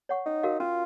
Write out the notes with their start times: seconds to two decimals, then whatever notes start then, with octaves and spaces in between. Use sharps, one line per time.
0.09 C#5 F#5 C#6
0.26 C#4 D#4
0.43 F#4 A#4 F5
0.60 C#4 F4